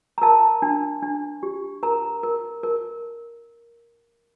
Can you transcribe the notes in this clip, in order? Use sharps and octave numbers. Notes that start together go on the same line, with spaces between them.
A#5
A#4 A5
D4
D4
G4
A#4 A#5
A#4
A#4